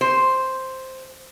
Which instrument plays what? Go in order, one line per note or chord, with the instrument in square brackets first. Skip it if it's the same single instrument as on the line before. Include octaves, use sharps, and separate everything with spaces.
[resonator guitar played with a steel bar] C5